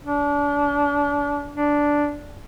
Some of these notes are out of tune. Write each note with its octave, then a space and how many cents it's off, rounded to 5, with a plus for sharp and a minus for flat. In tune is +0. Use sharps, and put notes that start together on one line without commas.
D4 -30
D4 -5